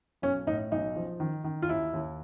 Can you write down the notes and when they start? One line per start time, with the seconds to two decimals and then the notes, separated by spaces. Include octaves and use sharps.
0.22 B1 C#4
0.47 A2 D#4
0.71 B1 D#4
0.96 F3
1.20 D#3
1.44 D#3
1.62 F4
1.68 D#2 E4
1.93 D#2